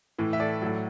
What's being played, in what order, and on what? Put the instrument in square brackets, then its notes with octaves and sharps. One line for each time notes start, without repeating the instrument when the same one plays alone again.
[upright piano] A2 E3
E5
A4 D5
A2 F#3